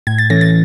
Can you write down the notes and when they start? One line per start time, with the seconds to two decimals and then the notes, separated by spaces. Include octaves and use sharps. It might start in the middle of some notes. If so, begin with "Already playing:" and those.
0.07 A2 G#6
0.18 A6
0.30 E3 A3 C#4 A#6
0.41 A6